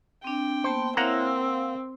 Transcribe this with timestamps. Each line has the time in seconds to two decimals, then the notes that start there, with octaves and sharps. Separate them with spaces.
0.24 C4 D4 G5
0.64 A#3 B3 C5 A5
0.97 A#3 C4 E4 C#5 E5 F#5 A#5
1.27 A#4 F5